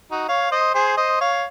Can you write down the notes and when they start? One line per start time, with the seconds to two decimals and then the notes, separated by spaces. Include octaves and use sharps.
0.11 D#4 F#4
0.28 C#5 F5
0.51 C5 D#5
0.74 G#4 C5
0.97 C5 D#5
1.20 C#5 F5